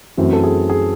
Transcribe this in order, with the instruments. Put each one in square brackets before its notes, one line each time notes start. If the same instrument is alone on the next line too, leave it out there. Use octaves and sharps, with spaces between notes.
[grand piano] F#2 E3 A3 C4 F#4
A4
G#4
G#4